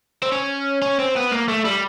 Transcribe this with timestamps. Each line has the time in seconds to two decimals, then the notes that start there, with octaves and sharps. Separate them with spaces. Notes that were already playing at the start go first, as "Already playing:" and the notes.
0.23 C4
0.32 C#4
0.82 C#4
0.99 C4
1.16 B3
1.32 A#3
1.48 A3
1.65 G3